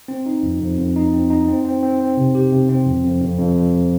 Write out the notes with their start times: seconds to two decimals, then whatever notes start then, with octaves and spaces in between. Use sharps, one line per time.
0.08 C4
0.26 D#4
0.43 F2
0.60 F2
0.78 F2
0.96 D#4
1.13 C4
1.30 D#4
1.48 C4
1.65 C4
1.83 C4
2.00 C4
2.17 C3
2.35 G4
2.52 C3
2.69 C4
2.87 F2
3.04 F2
3.22 F2
3.39 F2
3.56 F2